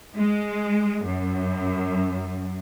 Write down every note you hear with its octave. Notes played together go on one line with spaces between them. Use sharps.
G#3
F#2